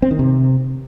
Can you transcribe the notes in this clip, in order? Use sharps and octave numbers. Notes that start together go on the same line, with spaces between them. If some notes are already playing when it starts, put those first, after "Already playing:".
C4
D#3
C3